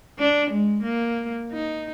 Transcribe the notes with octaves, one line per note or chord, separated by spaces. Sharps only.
D4
G#3
A#3
D#4